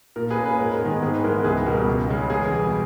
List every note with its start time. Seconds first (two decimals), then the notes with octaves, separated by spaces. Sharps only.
0.16 A#2 A#4
0.30 G#4 B4
0.38 A#3 C#4
0.44 G#4 B4
0.59 G#2 A#4
0.81 D#3 G#3 B3
1.02 G#2 G#4
1.14 B4
1.23 E3 G#3 B3 A#4
1.44 C#2 G#4 B4
1.66 B2 G3 A#4
1.87 C#2
2.09 C#3 G#3 C#4
2.30 E2 G#4
2.51 B2 G3